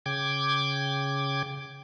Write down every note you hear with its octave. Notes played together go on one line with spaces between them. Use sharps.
C#3 G5 D6 G#6